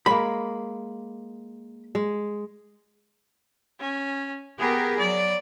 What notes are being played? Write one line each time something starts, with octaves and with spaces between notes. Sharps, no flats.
G#3 A#3 B5
G#3
C#4
B3 G4 G#4 A#4
F#3 D5